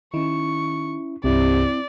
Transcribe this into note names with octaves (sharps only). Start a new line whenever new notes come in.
D#3 C#4 E4 C#6
C2 G2 C3 C4 E4 D5